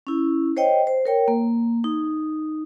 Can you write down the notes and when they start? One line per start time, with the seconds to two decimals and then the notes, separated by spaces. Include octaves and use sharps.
0.07 C#4 E4
0.57 C5 C#5 D#5 G5
0.87 C5
1.05 A#4 C#5 G5
1.28 A#3
1.84 D#4